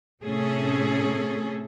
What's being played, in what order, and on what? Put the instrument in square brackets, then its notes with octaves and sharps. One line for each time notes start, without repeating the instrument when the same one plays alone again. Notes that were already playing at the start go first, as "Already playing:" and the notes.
[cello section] A2 C3 A3 C#4 G#4 A4